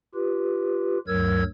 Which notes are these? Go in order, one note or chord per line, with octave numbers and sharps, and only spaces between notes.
F4 G4 B4
D2 G2 F#3 A#4 E6 G#6